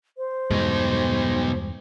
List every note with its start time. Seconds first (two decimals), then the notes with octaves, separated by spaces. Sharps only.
0.18 C5
0.51 E2 G2 B2 G#3 D#4